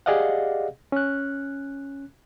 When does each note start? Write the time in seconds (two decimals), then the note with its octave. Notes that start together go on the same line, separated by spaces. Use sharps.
0.06 G4 G#4 D5 D#5 F5 F#5
0.92 C#4 F#6